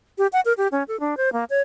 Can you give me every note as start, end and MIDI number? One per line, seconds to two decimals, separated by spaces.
0.18 0.27 67
0.33 0.40 78
0.45 0.53 70
0.57 0.68 67
0.72 0.83 61
0.88 0.99 69
1.00 1.17 62
1.17 1.32 72
1.33 1.44 58
1.50 1.62 73